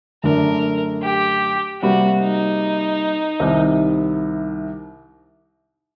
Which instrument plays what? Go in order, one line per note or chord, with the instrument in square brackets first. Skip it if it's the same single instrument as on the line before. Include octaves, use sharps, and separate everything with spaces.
[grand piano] F#2 D3 A3 D4 [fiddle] A#4
[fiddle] G4
[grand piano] C3 G3 A#3 [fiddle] F#4
[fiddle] D#4
[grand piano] C2 C3 D#3